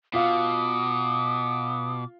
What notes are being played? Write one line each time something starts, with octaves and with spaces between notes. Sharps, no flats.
B2 F4 F5 D6 D#6